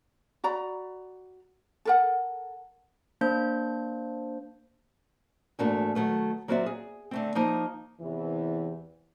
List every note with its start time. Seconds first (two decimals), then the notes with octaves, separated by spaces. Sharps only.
0.44 F#4 D5 A#5 B5
1.85 A4 A#4 F#5
3.21 A#3 D4 C5 G6
5.59 E2 G#2 A3 A#3 D4 F#4
5.95 D#3 F#3 A3 B4
6.48 F#3 A#3 C4 F#4 D5 E5
6.66 G#4
7.11 D3 A3 C4
7.35 F3 A#3 D#4
8.00 E2 C3 E3